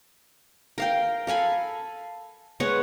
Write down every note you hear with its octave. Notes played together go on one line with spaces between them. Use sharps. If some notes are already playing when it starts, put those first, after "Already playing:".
A#4 F5 G5
A4 F5 G#5 B5
G#3 B3 C#5 F#5